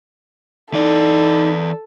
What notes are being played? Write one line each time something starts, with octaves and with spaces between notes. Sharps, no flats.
E3 D#4 A4 D5